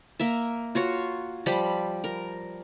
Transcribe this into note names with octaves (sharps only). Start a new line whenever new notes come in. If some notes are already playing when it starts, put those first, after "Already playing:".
A#3 A#4 E5
F4 F#4 C#5
F3 G3 G4 B5
A#4